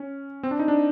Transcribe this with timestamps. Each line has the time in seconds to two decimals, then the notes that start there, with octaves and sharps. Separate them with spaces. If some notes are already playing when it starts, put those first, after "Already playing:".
Already playing: C#4
0.43 C4
0.51 D4
0.59 D#4
0.68 D4